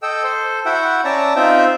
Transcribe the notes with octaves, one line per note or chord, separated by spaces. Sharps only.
A4 D#5 G5 E6
A4 C5
E4 F#4 E5 F#5 G5
C#4 D5 E5 A5 A#5
C4 D#4 F4 E5 G5